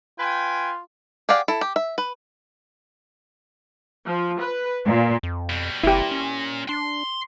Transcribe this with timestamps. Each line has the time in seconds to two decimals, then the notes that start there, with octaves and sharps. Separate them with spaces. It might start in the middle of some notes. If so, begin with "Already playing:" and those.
0.19 F4 B4 G5 G#5
1.29 G4 G#4 D5 F5 F#5
1.48 E4 A4
1.61 G4
1.76 E5
1.98 B4
4.05 F3
4.39 B4
4.85 A#2
5.23 F2
5.50 B2 G3
5.84 F#1 A#2 E4 G4
6.11 C#4
6.69 D4 C6